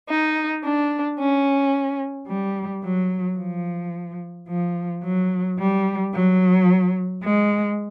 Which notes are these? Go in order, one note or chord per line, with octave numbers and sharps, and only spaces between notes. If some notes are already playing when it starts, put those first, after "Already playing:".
D#4
D4
C#4
G3
F#3
F3
F3
F#3
G3
F#3
G#3